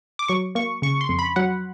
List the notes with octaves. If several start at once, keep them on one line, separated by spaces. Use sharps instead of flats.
D6
F#3 C#6
A#3 C#6
C#3 C#6
C6
F2
B5
F#3 F#5